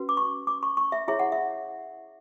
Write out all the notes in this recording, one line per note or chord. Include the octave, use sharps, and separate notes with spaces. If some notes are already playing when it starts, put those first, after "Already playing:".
Already playing: C#4 F#4 B4
D6
C#6
D6
C#6
C#6
E5
E4 G#4 C#5 E5
F#5
E5